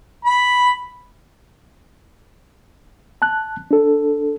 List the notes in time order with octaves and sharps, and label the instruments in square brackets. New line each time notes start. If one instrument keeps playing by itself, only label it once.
[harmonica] B5
[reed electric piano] A5 F#6
D4 A4